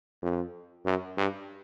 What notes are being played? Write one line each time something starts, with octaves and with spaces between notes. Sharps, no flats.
F2
F#2
G2